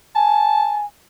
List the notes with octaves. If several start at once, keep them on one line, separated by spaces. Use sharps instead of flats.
G#5 A5